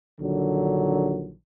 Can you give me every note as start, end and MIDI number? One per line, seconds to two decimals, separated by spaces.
0.19 1.33 34
0.19 1.33 50
0.19 1.33 51
0.19 1.33 54